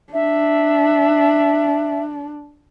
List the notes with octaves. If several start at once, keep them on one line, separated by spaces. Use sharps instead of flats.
D4 E5